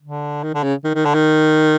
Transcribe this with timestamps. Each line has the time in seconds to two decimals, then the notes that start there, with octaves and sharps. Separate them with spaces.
0.02 D3
0.43 D#3
0.54 D3
0.63 C#3
0.84 D#3
0.95 D#3
1.05 D3
1.14 D#3